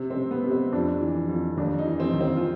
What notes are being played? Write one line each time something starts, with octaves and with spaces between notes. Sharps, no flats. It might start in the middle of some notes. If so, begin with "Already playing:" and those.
Already playing: C3
C4
C3
B3
C3
C4
F2 D4
E3
F2
D#2 D4
D#4
E3
C4
D#2
C4
F4